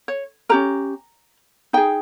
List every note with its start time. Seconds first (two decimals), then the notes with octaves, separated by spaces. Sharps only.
0.08 C#5
0.49 C#4 G4 A#4 A#5
1.73 D#4 G#4 G5